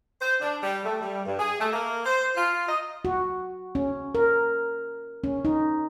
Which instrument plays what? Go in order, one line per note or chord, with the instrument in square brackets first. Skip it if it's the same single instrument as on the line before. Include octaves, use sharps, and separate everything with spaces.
[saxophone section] C5
D4
G3
A3
G3
G2
G#4
A3
A#3
C5
F4
D#5
[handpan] F#4
C#4
A#4
C#4
D#4